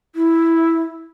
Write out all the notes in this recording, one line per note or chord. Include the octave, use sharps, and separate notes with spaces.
E4